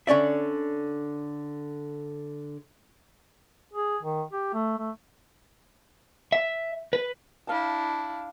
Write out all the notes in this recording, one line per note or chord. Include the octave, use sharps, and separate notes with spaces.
D3 C#4 D5 E5
G#4
D#3
G4
A3
A3
E5
B4
D4 E4 F5 A5